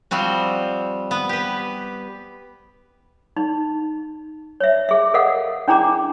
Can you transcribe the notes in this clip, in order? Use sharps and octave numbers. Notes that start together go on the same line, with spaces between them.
F3 G3 C4 F#4
B3
G4 B4
D#4
C#5 E5
G#4 E5
A4 A#4 D#5 F5 F#5
C#4 D4 E4 G#4 A#5 D6